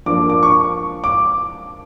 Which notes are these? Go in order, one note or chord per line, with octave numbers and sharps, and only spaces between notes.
F3 A#3 D4 D6
D6
C#6
D6